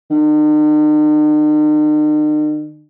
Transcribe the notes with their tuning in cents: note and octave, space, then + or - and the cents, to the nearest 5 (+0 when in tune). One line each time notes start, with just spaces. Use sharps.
D#3 -45